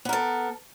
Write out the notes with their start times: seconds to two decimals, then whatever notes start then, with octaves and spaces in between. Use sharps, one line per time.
0.05 B3
0.09 A#4
0.13 A4